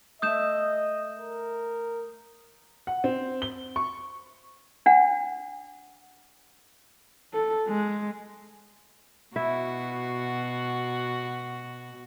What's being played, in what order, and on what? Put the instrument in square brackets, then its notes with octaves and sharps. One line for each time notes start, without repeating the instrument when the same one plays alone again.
[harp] A3 E5 [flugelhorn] D#5 [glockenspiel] D#6 G6 E7
[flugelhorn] A#4
[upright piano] F#5
C4
G7
C#6
[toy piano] D4 F#5
[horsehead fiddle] A4
G#3
[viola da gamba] B2 F#4 [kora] E4 E5